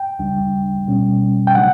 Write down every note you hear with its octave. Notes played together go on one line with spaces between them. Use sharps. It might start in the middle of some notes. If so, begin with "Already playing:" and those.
Already playing: G5
D2 C#3 G3 D4
B2 G3 C#4
G5
C#3 F#3 A3 D4 F#5